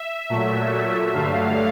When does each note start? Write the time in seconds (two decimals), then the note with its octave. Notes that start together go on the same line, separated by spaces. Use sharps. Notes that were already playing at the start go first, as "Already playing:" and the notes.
Already playing: E5
0.30 A#2 F#3 A3
1.14 G2 D3 F#3 A3 F5